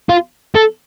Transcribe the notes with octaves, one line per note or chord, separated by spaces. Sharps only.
F4
A4